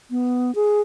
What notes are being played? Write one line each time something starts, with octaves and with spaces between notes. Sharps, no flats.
B3
G#4